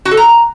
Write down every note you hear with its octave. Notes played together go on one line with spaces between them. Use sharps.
F#4
A4
A#5